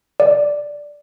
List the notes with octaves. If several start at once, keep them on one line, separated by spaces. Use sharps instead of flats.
D5